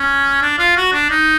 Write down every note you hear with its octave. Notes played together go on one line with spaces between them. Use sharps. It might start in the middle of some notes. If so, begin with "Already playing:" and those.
Already playing: C#4
D4
F4
F#4
D4
D#4